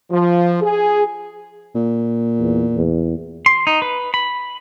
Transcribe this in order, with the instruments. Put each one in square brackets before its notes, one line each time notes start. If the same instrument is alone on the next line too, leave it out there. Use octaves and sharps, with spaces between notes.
[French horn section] F3
G#4
[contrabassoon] A#2
[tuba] E2
E2
[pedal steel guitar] C6
D#4
B4
B5